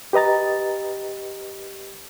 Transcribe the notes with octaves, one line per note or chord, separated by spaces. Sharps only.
G4 B4 D#5 A#5 A6